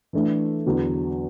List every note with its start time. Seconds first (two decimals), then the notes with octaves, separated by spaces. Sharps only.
0.13 E3 A3 D4
0.65 E2 D3 F#3 B3 D4